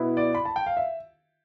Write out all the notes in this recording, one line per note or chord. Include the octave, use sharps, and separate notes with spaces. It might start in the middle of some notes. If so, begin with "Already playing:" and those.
Already playing: B2 B3 E4
D5
B5
A5
G5
F5
E5